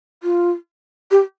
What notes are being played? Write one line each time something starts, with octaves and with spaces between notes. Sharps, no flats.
F4
G4